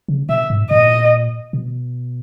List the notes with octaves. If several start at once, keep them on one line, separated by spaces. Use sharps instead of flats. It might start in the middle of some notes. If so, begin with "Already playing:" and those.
C#3
B2 E5
G#2
A#2 D#5
B2